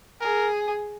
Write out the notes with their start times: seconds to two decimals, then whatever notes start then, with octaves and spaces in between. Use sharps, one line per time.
0.21 G#4 A#4